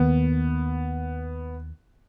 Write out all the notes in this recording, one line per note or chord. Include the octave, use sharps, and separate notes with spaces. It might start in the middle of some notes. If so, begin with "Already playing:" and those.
Already playing: D#2 D#3 A#3 B3